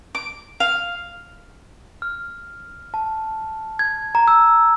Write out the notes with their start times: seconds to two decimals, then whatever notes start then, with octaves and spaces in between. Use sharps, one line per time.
0.15 D6
0.60 F5
2.02 F6
2.94 A5
3.79 G#6
4.15 A#5
4.28 E6